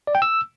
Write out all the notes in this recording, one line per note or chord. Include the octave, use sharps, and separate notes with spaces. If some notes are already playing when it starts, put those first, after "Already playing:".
D5
G5
E6